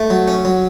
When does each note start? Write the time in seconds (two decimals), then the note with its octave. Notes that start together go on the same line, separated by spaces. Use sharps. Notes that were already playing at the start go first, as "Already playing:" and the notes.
Already playing: A3
0.10 F#3
0.28 C#4
0.45 F#3